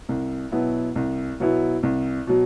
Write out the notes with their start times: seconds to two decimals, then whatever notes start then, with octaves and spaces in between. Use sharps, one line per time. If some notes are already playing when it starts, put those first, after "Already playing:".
0.09 C2
0.52 B2 F#3 B3 E4
0.95 C2
1.40 B2 F#3 B3 E4
1.83 C2
2.27 B2 F#3